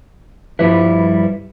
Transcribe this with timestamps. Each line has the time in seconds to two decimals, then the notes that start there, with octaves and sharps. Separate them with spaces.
0.59 G2 F3 G3 E4 B4